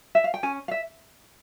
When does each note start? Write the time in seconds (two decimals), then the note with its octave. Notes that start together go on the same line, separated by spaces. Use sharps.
0.15 E5
0.24 F5
0.34 G5
0.43 C#4 G#5
0.68 F5
0.71 E5